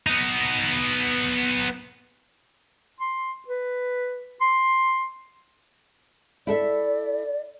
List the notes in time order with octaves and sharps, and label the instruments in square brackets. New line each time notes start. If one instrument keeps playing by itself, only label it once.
[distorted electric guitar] B3 D#4
[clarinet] C6
B4
C6
[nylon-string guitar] E4 A4 E5 [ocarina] D5